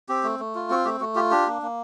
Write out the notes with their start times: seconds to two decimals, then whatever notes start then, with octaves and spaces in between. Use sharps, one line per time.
0.09 C4 G4
0.23 A3
0.40 A3
0.55 F4
0.70 C4 F#4
0.85 A3 G4
1.00 A3 F#4
1.15 F4 G4
1.31 D4 G4
1.47 A#3
1.62 A#3